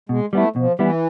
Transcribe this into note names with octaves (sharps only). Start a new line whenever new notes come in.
B2 G#3
G3 A3 B3 E4
B2 F3
E3 G3 B3 E4